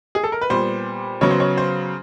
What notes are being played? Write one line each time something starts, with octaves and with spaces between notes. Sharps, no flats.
G#4
A4
A#4
B4
A#2 G3 B3 C5
C#3 F#3 B3 C#5
C5
C#5
C5